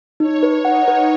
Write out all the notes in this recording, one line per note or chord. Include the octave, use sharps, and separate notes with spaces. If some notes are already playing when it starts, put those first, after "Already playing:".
D#4 C#5
B4
D#4 F#5
B4